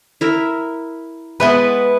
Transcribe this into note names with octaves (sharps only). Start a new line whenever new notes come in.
E4 A#4 E5
G#3 B3 E4 B4 A5